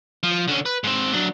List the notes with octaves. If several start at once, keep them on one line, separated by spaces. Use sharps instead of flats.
F3
D3 C#4
B4
G#2 C4
F#3 D4